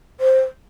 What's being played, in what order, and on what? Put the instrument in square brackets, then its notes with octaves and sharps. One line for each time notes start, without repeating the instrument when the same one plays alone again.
[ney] C5